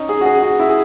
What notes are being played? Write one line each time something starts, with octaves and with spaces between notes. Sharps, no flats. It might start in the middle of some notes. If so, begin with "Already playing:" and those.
Already playing: C#4 D#4
G#4
F#4
G#4
F#4
E4
G#4